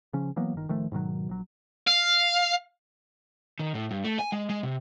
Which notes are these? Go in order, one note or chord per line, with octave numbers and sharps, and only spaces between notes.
C#3 F3 C#4
E3 F#3 A#3 B3
G1 D#3
D1 D#3 F3 A3
G#2 B2 D#3 F#3
A#1 F#3
F5
D#3
A2
G2
A3
G#5
G#3
G#3
C3